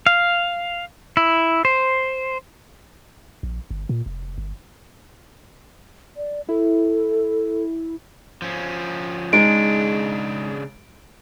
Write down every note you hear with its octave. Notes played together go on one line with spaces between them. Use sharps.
F5
E4
C5
A#1
G1
A#2
F1
G1
D5
E4 A4
F3 C#4
C#3 G#3 D4 D#4 D7